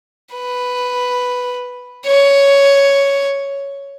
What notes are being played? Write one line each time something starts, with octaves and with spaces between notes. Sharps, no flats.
B4
C#5